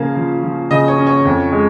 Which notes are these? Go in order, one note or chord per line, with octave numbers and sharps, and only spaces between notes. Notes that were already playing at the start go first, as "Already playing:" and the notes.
Already playing: C#3 F3 A#3 C#4 F5
F3
F3
C#3 D#5
C#5
C#4
C#5
F2
G#3